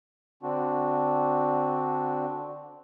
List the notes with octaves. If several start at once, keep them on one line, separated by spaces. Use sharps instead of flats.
D3 C4 D4 F#4